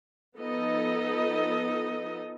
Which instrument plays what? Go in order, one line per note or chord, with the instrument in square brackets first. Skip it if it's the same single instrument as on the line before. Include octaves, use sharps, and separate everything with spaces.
[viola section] F3 B3 D#4 A4 D#5